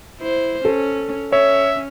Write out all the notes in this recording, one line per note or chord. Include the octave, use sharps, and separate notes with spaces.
E4 C5
C#4 A4
C#4 C#5 E5